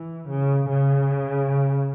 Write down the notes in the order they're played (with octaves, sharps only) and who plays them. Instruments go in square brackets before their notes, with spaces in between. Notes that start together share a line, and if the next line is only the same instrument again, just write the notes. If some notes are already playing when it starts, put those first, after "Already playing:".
Already playing: [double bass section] E3
C#3
C#3